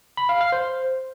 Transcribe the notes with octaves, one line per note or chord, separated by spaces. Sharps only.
B5
F5
F5
C5